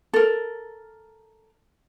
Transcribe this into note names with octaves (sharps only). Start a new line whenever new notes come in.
A4 A#4